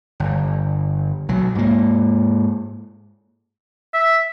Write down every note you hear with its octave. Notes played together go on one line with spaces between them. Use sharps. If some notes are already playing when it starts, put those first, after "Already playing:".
G1
B1 F#3
G#2 A#3
E5